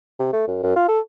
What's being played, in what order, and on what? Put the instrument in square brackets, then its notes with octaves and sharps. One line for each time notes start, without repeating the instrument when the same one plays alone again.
[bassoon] C3
A3
F#2
F#2
F4
A4